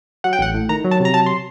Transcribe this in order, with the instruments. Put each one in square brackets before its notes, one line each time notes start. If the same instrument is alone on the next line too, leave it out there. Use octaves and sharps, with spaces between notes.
[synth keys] F#3 F#5
G5
A1 F#5
A2
D#3 A#5
F#3
A5
C3
A#5
F#3 A5
C6